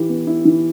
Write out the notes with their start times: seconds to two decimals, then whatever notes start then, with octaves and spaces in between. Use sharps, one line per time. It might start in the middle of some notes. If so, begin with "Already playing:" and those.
Already playing: E3 E4 G4
0.09 B3
0.27 E4
0.45 E3